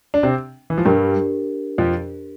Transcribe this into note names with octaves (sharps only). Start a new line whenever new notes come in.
D4
C3 C4
E3
F3
G2 G3 D4 G4 A#4
F2 F3